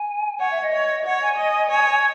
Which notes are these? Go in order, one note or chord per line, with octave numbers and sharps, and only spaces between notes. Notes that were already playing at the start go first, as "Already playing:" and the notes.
Already playing: G#5
C#5 F#5
E5
D#5
C#5
C#5 F#5
G#5
D#5
C#5